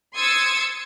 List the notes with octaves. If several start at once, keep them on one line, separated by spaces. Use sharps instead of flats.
C6 D#6 E6 G#6 A6 C#7